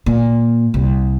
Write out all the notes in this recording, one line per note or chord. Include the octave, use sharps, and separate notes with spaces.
A#2
C2